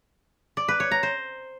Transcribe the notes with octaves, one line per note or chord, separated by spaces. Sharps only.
D5
B4
C#5
A#5
C5